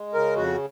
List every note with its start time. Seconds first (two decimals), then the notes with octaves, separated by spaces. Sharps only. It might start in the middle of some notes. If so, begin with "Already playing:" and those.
Already playing: G#3
0.14 C#3 A#4
0.36 F2 F#4